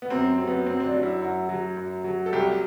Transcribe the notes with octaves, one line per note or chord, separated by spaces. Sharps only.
B3
F#2 C4
F#3 C4
B3
F#2 C4
C4
D4
F#3
E4
F#2 F#4
F#3
F#2
F#3
A4
C2 G4